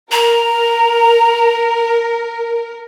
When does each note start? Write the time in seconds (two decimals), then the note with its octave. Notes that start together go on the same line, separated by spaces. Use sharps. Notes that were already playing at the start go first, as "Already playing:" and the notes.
0.12 A#4 A#5